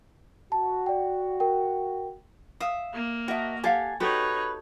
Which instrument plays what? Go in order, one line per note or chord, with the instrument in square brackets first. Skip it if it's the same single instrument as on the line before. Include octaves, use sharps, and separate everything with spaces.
[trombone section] F#4 [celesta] A5
[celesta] D5 G5
A#4 G5
[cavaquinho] E5 D#6 [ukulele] F5
[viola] A#3
[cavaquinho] F#4 D#5 [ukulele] A#4 E5 A5
[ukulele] G4 F5 F#5 [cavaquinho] A4 G#5
[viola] D#4 C#5 [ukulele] F#4 G4 A4 [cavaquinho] B4